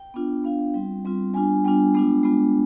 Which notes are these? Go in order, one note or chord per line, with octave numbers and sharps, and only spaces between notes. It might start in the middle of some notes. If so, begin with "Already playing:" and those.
Already playing: G5
B3 D4 F4
B3 D4 F4 F5
G3 C4 F4 G5
G3 C4 F4
G3 B3 D4 F4 G#5
G3 B3 D4 F4 G5
G#3 B3 D4 F4
G#3 B3 D4 F4